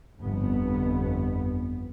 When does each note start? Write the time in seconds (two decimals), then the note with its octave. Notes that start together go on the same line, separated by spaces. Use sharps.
0.21 G1 F2 B3